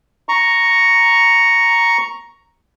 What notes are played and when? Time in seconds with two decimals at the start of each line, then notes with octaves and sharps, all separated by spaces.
0.29 A#5 C#6